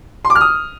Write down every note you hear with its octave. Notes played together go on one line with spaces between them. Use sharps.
C6
D6
F6
D#6